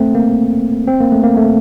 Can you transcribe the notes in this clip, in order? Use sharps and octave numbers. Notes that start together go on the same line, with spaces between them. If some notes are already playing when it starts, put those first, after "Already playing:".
Already playing: A3 C4
A#3
C4
A#3
A3
A#3
A3